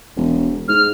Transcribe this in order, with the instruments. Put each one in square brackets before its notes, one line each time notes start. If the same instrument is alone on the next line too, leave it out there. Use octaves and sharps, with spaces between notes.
[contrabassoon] E1
[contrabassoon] G#2 [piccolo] F6